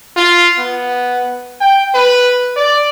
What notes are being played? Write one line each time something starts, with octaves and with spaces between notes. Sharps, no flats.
F4
B3
G5
B4
D5